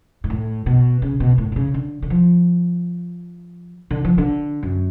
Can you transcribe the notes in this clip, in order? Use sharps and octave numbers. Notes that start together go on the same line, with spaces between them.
G#2
A2
B2
C#3
B2
A2
B2
C#3
D3
D3
F3
D3
F3
D3
F#2